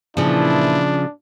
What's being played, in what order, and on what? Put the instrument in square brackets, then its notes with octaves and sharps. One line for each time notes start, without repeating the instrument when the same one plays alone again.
[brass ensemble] A#2 E3 E4 [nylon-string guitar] C#3 F3 [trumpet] D4